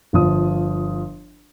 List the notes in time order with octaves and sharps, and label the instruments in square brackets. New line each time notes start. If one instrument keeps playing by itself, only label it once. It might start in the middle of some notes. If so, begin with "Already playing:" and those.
[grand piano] G1 F3 D#6